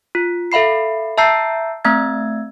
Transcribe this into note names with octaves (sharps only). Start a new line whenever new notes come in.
F4
A4 E5 F5 B5 C7
E5 A5 A#5 E6 G6 C7
A3 C4 E5 E6 G#6